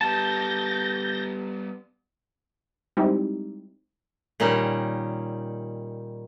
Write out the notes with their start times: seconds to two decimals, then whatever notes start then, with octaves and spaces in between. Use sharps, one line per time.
0.01 G3 B3 A5 G6 A6 A#6
2.97 G3 G#3 C4 D#4 E4 G4
4.40 A#2 D#3 G3 C#4 D#4